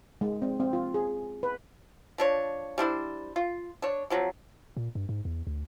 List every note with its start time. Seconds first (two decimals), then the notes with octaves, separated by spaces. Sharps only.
0.21 G#3
0.42 C4
0.60 C4
0.73 F4
0.94 G#4
1.43 B4
2.18 F3 D4 C#5
2.78 G3 D4 E4 C5
3.36 F4
3.82 D4 C#5
4.10 C3 F3 F#3
4.77 A#2
4.95 G2
5.09 G#2
5.25 E2
5.47 D2